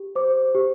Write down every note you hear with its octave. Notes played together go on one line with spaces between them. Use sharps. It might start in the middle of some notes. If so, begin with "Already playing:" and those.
Already playing: G4
C5 D6
G4